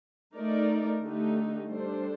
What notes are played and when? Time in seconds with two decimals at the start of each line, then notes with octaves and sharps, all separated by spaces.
0.36 A3 D#4 A#4 D5
1.03 D3 A3 D#4 G4
1.69 G3 D4 A4 C5